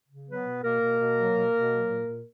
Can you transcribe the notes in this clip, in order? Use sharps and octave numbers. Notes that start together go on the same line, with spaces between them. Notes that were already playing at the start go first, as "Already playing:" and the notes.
C#3
F#3 B3 B4
B2
B2 A#3 A#4
B2
B2
F#3
B2
B2
F#3
A#2
A#2